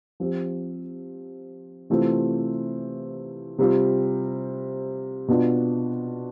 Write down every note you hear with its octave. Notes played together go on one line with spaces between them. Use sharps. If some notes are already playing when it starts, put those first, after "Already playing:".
F3 C4 G4
C3 E3 A3 C4 F4
C3 G3 C4 F4
B2 B3 D4 F4